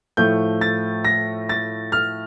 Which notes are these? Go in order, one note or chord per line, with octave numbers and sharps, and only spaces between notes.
A2 F3 A3 G6
A6
A#6
A6
F6